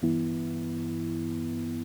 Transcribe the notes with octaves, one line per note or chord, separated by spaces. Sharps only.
G2 E3 B3 E4